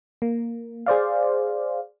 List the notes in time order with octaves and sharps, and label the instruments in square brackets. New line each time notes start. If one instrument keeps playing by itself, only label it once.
[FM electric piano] A#3
G#4 C5 D5 F5